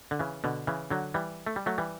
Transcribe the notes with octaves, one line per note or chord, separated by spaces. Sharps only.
D3
C#3 E3
B2 D3
C#3 E3
D3 F#3
E3 G3
A3
G3
F#3 A3
E3 G3